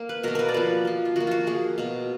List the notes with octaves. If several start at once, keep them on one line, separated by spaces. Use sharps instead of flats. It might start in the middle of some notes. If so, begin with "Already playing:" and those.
Already playing: A#3
B4
B2 A#3 A#4
A#4 B4
D5
F3 A#3 B4
F3 A#3
F4
F3 A#3 F#4
F4 F#4
F3 A#3 G#4
B2 A#3